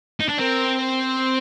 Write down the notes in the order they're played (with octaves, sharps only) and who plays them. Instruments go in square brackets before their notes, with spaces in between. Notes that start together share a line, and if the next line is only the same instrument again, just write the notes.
[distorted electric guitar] D#4
D4
[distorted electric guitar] C4 [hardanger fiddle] A#4
[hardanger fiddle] C5